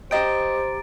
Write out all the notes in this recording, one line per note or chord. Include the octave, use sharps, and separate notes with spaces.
G4 C5 D#5 G5 A#5 A6 D7